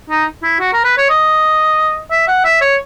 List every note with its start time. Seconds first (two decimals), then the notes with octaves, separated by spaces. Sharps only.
0.10 D#4
0.43 E4
0.60 F#4
0.73 A#4
0.84 B4
0.98 C#5
1.09 D#5
2.11 E5
2.28 F#5
2.44 E5
2.61 C#5